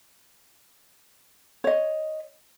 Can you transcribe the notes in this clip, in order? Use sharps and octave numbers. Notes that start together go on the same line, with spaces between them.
C#5 D#5